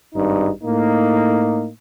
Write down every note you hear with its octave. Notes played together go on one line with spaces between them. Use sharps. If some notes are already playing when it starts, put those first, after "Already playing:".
G#1 G2 D#4
A2 A#3 D#4